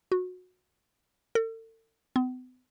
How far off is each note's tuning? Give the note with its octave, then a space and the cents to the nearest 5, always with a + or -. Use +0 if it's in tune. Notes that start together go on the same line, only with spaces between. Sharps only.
F#4 -20
A4 +40
B3 +45